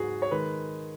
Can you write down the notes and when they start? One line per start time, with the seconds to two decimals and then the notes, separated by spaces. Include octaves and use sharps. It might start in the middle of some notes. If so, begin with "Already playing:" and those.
Already playing: G#2 F#3 B3 F#4 G#4
0.22 C#5
0.31 D#3 G#3 B4